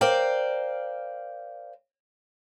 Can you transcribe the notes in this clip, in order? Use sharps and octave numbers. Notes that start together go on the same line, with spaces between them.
A#4 C5 D5 F5 G5